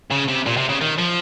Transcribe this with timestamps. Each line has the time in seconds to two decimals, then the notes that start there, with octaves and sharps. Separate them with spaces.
0.11 C#3
0.29 C3
0.46 A#2
0.57 C3
0.69 C#3
0.81 D#3
0.98 F3